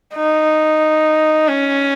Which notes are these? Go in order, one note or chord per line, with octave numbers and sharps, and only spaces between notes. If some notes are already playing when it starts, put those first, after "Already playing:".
D#4
C#4